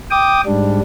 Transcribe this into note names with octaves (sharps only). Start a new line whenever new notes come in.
G5 D6 D#6
G#2 G3 D4